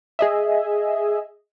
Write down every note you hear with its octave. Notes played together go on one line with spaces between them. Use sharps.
G#4 D#5 E5